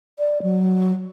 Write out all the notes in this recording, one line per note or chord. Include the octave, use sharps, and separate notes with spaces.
D5
F#3